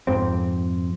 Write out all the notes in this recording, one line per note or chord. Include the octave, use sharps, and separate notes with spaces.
F2 G#2 C4